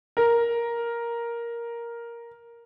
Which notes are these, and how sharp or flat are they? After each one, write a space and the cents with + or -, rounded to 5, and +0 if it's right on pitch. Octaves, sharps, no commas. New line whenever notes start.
A#4 +5